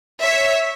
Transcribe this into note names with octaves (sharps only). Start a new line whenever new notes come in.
C#5 E5